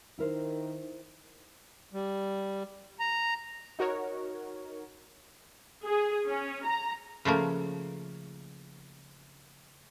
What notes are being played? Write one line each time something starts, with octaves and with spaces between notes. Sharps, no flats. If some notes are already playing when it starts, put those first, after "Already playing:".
D#3 E4 A#4 C5
G3
A#5
D#4 F#4 A#4 C#5
G#4
C#4
A#5
C#3 F3 A3 A#3